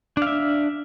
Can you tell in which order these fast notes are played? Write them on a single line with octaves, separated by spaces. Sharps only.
D4 F5 E5